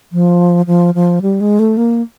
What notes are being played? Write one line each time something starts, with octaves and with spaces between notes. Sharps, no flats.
F3
F3
F3
G3
G#3
A3
A#3